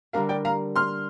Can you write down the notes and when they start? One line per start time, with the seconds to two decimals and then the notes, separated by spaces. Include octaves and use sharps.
0.13 D3 G3 D4 A#4 F5 A#5
0.29 D5 G5
0.45 F5 A#5
0.76 C6 F6